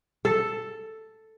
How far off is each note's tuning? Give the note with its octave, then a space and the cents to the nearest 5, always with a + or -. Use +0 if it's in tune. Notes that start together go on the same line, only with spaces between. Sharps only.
A4 +5